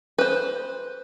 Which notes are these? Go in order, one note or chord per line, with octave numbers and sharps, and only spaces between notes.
B4 C5